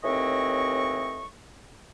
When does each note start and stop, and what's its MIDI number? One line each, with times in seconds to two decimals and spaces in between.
0.04 1.25 39
0.04 1.25 45
0.04 1.25 52
0.04 1.25 60
0.04 1.25 75
0.04 1.25 85